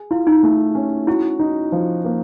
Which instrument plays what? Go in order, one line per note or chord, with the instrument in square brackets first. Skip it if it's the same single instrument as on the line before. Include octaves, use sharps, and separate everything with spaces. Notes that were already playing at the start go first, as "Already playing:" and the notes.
Already playing: [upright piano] G#4
[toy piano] E4 [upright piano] F4
[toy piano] D#4
[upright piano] A3
C#4
[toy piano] E4 [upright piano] F#4
[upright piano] D#4
F3
A#3